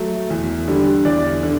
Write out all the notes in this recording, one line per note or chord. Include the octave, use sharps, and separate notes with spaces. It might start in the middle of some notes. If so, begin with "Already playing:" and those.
Already playing: F#3 A3
E2
D3 G3
E2 D5
D3